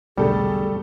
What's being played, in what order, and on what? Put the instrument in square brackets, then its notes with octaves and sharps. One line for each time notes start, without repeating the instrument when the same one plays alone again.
[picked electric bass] E1 B1 D3 [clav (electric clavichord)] G3 [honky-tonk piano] A3 A4 [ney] G#4